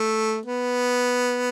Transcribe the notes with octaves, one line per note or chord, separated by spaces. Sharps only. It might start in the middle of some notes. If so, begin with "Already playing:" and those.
Already playing: A3
B3